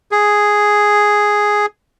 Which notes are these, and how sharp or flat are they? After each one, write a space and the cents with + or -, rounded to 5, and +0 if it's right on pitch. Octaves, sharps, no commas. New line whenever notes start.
G#4 +0